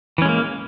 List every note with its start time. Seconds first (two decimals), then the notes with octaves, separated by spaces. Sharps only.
0.18 E3
0.22 C#4
0.25 G#3
0.29 A#3